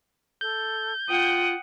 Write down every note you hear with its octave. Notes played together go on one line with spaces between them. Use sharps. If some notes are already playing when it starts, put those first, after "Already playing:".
A4 G6
F4 F#5 G5 D#6